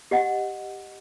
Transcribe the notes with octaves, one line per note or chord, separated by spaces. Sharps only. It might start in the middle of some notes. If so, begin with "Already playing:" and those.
G4 D#5 F#5